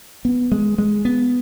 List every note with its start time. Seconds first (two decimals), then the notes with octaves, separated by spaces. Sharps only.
0.25 B3
0.52 G#3
0.78 G#3
1.05 B3